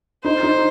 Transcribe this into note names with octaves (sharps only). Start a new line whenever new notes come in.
D#4 C5
D#4